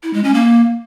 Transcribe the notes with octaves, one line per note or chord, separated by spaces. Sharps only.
E4
G#3
C#4
A#3